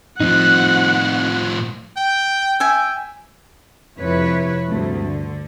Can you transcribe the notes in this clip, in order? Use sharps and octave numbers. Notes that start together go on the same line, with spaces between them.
A2 F3 C4 D#4 F#5 F#6
G5
E5 G5 G#5
F2 C3 E4 B4 C#5
D2 G2 C3 A3
D3